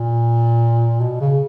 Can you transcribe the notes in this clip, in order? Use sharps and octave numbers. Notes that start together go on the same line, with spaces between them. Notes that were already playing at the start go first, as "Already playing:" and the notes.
Already playing: A#2
B2
C#3